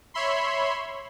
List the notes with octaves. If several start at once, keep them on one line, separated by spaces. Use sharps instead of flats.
C#5 E5 B5 C6